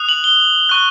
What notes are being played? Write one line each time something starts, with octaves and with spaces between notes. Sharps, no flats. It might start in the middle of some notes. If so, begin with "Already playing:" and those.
Already playing: D#6 F#6
F#7
G7
C#6 F#6